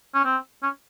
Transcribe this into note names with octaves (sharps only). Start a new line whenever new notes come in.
C#4
C4
C#4